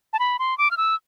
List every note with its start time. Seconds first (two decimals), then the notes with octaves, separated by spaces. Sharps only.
0.13 A5
0.19 B5
0.39 C6
0.58 D6
0.71 F6
0.77 E6